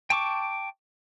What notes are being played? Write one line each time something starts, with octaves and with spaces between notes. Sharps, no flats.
G5 A5 C#6 D6